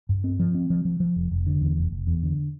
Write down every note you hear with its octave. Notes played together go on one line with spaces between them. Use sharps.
G2
C4
F3
C4
F3
F3
F3
F1
F1
D3
E2
F1
F1
E2
D3